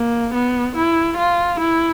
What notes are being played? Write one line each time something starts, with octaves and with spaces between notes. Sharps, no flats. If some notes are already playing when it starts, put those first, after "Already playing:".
Already playing: A#3
B3
E4
F4
E4